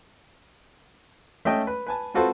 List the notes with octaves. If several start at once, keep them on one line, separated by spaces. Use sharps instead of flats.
A3 C#4 D#5 G5
B4
B4 G#5 A5
C4 F4 F#4 A4 B4 C5